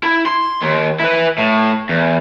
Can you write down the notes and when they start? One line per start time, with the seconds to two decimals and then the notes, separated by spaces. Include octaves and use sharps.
0.03 E4
0.26 C6
0.62 D#2
1.00 E4 B4
1.38 A2
1.89 E2